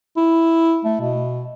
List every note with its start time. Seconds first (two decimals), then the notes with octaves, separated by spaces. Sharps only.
0.17 E4
0.85 A3
1.01 B2